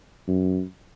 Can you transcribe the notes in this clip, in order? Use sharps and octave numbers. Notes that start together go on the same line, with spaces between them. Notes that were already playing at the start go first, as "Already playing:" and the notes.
F#2